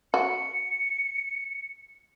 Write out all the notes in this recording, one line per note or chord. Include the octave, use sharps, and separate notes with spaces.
F#4 C#7